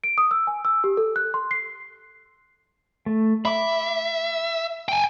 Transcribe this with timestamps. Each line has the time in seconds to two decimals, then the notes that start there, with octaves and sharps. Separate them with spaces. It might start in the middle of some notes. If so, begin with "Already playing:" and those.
0.04 D7
0.18 D#6
0.31 E6
0.47 G#5
0.65 E6
0.84 G4
0.97 A4
1.16 F#6
1.34 C6
1.51 C7
3.06 A3
3.45 E5 B5 D6
4.88 G5 G#5